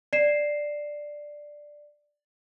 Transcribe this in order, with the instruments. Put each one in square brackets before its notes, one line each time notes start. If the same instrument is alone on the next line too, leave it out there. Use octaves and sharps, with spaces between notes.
[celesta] D5 C7 E7